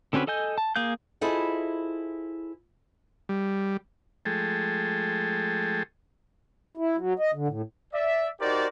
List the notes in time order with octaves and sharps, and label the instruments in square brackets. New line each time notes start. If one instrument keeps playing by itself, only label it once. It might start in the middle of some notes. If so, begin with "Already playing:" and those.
[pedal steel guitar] D3 C4 C#4 F#4 B4
A4 D#5 G#5 G6
A5
A#3 G#4 F5 G6
[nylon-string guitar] E4 F4 G#4 A4 C5 D#5
[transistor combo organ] G3
F3 G#3 A3 G#4 A4 G5
[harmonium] E4
F#3
D#5
D3
A2
[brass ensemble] D5 E5
D#4 F#4 G4 A#4 C5 D5